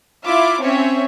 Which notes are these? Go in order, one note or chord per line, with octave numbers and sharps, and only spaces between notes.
E4 F4 E5 D6
C4 C#4 C#5 E5